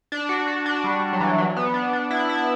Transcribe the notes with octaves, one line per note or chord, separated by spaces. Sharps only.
D4
F#4
F#4
D4
G3
F#3
E3
F#3
B3
D4
D4
E4
E4